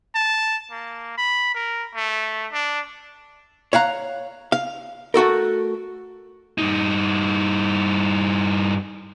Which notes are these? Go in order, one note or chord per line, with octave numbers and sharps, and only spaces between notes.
A5
A#3
B5
A#4
A3
D4
C#5 F5 F#5 A#5
F5
A3 F#4 A4 A#4
G2 D#4